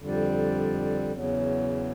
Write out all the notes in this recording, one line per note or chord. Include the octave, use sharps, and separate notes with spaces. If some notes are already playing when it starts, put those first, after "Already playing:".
F2 D3 G3
E2 C#3 F#3